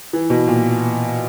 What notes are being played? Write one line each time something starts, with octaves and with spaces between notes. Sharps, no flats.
E3
B2
A#2